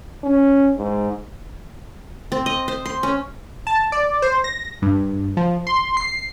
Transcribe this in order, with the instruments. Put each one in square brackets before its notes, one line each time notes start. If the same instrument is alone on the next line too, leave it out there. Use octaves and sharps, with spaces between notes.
[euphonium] C#4
G#2
[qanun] C4
D#5
C5
C6
C#4
[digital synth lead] A5
D5
C5
A#6
G2
F3
C6
C7